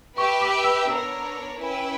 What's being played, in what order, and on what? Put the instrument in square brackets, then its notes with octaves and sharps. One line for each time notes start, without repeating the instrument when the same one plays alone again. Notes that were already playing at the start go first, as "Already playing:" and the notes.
[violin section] G4 B4 E5 G5 [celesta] C#6
[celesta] D6
E6
[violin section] B3 D4 A#4 C#5 [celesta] E6
[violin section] C#4 E4 B4 E5 G5